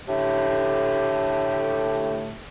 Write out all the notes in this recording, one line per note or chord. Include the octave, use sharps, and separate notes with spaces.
A2 D3 A3 G4